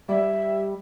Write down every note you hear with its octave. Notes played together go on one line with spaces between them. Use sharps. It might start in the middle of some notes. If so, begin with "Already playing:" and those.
G3 E5